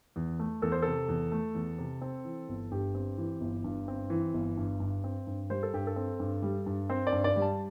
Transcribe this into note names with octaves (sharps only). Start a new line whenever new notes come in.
E2
A3
E2 A4
C5
C3 A4
E2
A3
E2
C3
C4
E3
G1
G2 G4
C4
E3
G1
G2
C4
E3
G1
G2
G2
C4
G2
G3 C5
A4
G2 G4
A4
C4
G2
G3
G2
C4 C5
D5
G2
D5
G3
A5